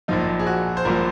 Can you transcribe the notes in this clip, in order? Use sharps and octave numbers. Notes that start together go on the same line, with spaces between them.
A#1 A#2 F3 D#4
G#4
F#4
C5
A#1 A#2 F3 A#4